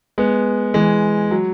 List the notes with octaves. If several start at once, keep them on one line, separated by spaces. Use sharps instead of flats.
G#3 B3
E3 G#3
F#3